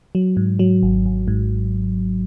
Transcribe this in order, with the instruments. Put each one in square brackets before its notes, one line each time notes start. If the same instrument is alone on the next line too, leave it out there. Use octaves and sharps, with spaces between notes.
[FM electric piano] F#3
G#2
F#3
G#1
G#1
G#2